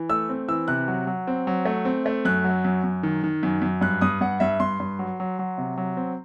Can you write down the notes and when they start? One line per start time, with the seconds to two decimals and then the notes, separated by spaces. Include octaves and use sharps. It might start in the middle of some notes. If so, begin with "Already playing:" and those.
Already playing: E3
0.10 A3 E6
0.29 C4
0.48 E3 E6
0.68 C3 F#6
0.88 F#3
1.07 F#3
1.27 C4
1.47 F#3
1.65 A3
1.85 C4
2.06 A3
2.25 F#2 F#6
2.44 F#3
2.64 F#2
2.83 F#2
3.03 D#3
3.24 D#3
3.43 F#2
3.62 F#2
3.81 G2 F#6
4.01 G2 D#6
4.21 G2 F#5
4.40 G2 E5
4.60 G2 C6
4.80 G2
4.99 F#3
5.20 F#3
5.39 F#3
5.58 C3
5.77 F#3
5.97 C4